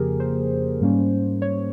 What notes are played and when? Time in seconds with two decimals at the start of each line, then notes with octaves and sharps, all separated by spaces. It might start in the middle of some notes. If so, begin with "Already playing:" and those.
Already playing: F2 C#3 F3 A#3 G4 G#4 A#4
0.20 C5
0.81 G#2 G3 A#3 C#4
1.42 C#5